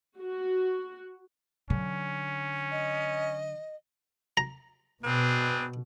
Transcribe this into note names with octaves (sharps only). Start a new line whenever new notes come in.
F#4
D3 F#3 C#4
D#5
A#5
B2 C4 D4 G#4 B4